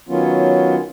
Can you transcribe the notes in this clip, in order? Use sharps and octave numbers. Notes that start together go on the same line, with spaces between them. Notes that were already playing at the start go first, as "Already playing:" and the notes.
D#3 F#3 B3 C#4 F4